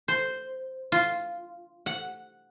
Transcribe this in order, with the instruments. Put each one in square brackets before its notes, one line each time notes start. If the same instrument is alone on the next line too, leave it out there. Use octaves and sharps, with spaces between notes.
[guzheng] C5
F4
F#5